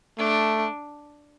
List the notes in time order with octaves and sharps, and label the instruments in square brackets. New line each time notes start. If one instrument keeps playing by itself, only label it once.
[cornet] A3 [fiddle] D4